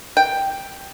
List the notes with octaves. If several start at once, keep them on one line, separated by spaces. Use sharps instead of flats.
G5